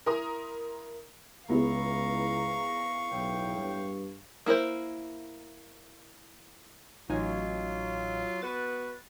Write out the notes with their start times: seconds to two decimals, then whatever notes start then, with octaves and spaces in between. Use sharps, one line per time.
0.06 E4 A#4 A#5 C6 D#6
1.49 C#2 B3 E4 G#4 F5 A#5 C#6
3.12 B1 E2 A2 G5
3.57 G2
4.46 A#3 E4 A#4 C5
7.09 A1 F#3 D#4 F4 G#5
8.42 B3 F#4 B4 A6